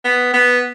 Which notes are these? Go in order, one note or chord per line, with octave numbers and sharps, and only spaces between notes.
B3
B3